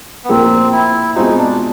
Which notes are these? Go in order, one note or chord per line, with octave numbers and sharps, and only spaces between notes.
B3
A#2 F3 A#3 C4
E4
B2 G#3 C4 D#4 F4
D4